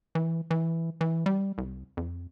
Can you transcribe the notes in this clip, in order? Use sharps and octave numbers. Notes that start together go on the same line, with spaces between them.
E3
E3
E3
G3
C2
F2